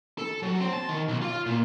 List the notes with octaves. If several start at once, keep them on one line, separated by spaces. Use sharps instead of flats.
A4
F#3
C4
A5
D#3
B1
F4
A#2